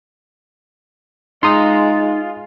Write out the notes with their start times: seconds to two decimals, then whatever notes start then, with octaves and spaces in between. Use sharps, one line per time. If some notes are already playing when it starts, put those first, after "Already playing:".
1.43 G#3 D#4 F4 A#5 C6 D#6